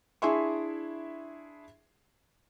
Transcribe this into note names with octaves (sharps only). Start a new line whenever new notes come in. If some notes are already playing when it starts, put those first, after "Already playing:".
D4 E4 G#4 E5 C6 C#6